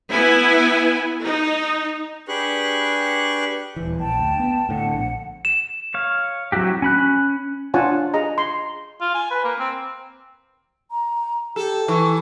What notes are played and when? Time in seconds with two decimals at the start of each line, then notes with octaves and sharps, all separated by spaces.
0.11 B3 E4 G#5
1.23 D#4
2.28 D4 G4 G#4 B4 C#6 F#6
3.76 D#1 E3
3.99 A#1 G5 A5
4.19 D2
4.39 B3
4.69 A2 D3 F#5
4.94 A#1
5.45 E7
5.94 C#5 F5
6.52 F#3 C4 E4 F#4 G4
6.82 C#4 B5 F#6
7.74 D4 F4 C#5 F#5 G#5 A5
8.14 G#4 D#5 A#5
8.38 C6
9.01 F4
9.15 G#5
9.31 B4
9.45 A#3
9.60 C4
10.91 A#5
11.56 G4 A4
11.88 E3 C#6